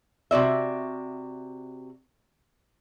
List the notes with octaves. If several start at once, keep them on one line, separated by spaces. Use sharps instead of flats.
C3 F#4 D5 E5